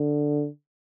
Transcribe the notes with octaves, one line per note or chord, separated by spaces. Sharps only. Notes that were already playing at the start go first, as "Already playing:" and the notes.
Already playing: D3